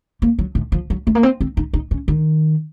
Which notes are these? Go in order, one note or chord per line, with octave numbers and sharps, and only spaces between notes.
A#3
F#3
A2
F3
F#3
A3
A#3
C4
C4
D#4
D#4
C#4
D#3